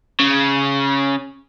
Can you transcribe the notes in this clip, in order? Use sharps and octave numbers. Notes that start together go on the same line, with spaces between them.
C#3